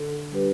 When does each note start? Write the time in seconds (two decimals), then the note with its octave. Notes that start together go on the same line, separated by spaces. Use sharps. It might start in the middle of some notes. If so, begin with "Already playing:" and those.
Already playing: D3
0.32 G3 D4 G4 B4